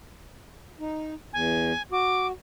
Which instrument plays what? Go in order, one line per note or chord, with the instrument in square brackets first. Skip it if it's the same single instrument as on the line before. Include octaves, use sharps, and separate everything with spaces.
[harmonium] D#4
[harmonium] E2 [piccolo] G#5
[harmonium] F#4 [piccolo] D6